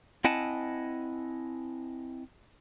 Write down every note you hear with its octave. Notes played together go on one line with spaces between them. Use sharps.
C4 E4 D#5 F#5 G#5 A5